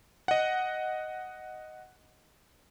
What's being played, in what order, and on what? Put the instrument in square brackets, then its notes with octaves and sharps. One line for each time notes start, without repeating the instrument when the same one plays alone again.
[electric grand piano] D#5 F#5